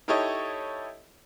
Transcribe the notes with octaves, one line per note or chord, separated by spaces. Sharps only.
D#4 E4 G4 A4 C#5 D#5